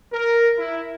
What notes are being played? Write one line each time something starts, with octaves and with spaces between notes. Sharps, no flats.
A#4
E4